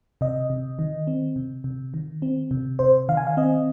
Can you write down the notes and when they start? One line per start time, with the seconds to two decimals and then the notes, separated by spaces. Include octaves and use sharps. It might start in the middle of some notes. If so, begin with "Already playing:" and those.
0.21 C3 D#5
0.50 C3
0.79 D#3
1.07 C4
1.36 C3
1.64 C3
1.94 D#3
2.22 C4
2.51 C3
2.79 C3 C5
3.09 D#3 F5
3.17 G#5
3.27 F5
3.37 C4 D#5